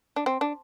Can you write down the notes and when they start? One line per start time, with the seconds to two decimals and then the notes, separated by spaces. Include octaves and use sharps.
0.16 D4
0.26 C4
0.41 D4